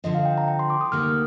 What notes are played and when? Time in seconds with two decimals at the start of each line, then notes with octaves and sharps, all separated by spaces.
0.04 D3 F3 C4 D#5
0.15 F5
0.25 G5
0.38 A#5
0.48 G5
0.59 C6
0.70 D6
0.81 D#6
0.92 D2 C3 D#3 A#3 F6
1.03 F6